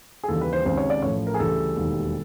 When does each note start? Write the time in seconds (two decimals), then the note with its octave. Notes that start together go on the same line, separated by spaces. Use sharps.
0.24 G#4
0.28 D#2 C#3 E3 G3 A4
0.41 B4
0.53 C5
0.66 C#2 C3 D#3 C5
0.77 C#5
0.90 D5
1.02 A1 A2 F3 C#5
1.27 A#4
1.34 G#4
1.39 D2 C#3 E3 G3 A4
1.77 E1 D#2 D#3 G3